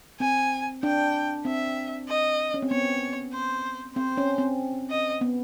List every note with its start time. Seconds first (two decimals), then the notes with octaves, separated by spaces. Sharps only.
0.20 C4 G#5
0.83 D4 G5
1.45 C4 E5
2.08 D#5
2.54 C#4
2.62 C4
2.71 B3 C#5
3.33 C5
3.96 C4 C5
4.17 C#4
4.38 C4
4.90 D#5
5.21 B3